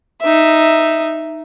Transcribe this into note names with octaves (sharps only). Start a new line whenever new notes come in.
D#4 E5